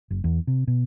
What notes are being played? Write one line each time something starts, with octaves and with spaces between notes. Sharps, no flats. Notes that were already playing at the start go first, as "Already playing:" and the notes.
F#1
E2
C3
B2